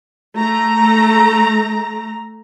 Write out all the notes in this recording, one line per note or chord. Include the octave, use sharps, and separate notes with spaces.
A3 A#5